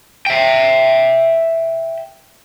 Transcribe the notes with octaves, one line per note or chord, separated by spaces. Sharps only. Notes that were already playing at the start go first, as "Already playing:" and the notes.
E5 G5